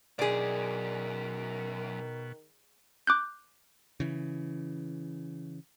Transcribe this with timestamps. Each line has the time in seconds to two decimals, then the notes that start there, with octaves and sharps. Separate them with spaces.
0.19 C2 F#2 B2 D#3 G#4 D5
3.07 D6 F#6 G6
4.00 C#3 E3